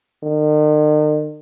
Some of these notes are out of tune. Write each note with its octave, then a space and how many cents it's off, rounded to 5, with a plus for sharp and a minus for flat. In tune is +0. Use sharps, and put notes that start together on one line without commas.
D#3 -45